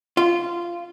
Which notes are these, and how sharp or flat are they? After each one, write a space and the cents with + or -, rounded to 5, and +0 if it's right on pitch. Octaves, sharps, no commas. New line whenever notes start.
F4 -15